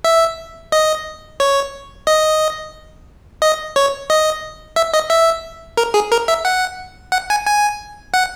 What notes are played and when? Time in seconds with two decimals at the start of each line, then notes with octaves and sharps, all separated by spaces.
0.04 E5
0.72 D#5
1.40 C#5
2.07 D#5
3.42 D#5
3.76 C#5
4.10 D#5
4.76 E5
4.94 D#5
5.10 E5
5.77 A#4
5.94 G#4
6.12 A#4
6.28 E5
6.45 F#5
7.12 F#5
7.30 G#5
7.47 G#5
8.14 F#5